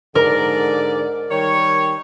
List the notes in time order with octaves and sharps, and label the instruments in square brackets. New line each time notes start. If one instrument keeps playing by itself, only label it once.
[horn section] G#2 D3 D5 [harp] A#4
[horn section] D#3 G3 C#5